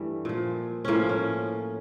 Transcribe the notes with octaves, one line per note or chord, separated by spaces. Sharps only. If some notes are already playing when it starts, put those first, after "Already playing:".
Already playing: G2 E3 G3 A3
A#2 F3
A2 F3 A#3 C#4
C#4